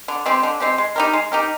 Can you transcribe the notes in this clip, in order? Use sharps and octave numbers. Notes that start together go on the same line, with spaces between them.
D3
G#3 C4 G4
D3
G#3 C4 G4
G#3
D#4 G4 A#4
G#3
D#4 G4 A#4